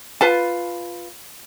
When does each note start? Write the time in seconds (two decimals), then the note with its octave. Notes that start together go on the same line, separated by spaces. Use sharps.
0.21 F4 B4 A5